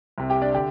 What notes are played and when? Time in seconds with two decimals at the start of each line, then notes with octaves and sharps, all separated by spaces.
0.18 C2 C3
0.30 G4 G5
0.42 D4 D5
0.54 D3 G4 G5